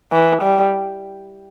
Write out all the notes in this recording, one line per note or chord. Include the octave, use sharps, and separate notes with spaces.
E3
G3